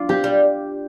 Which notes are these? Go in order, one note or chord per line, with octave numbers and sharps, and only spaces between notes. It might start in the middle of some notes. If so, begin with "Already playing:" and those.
Already playing: D4 F4
C4 G4
G3